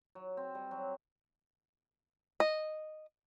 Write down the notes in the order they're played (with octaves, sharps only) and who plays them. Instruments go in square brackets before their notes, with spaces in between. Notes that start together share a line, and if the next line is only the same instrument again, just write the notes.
[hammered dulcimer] F#3
C4
G3
F#3
[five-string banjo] D#5